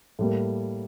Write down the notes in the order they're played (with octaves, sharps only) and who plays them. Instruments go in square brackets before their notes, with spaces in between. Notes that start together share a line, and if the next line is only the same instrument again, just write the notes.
[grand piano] A2 G3 A#3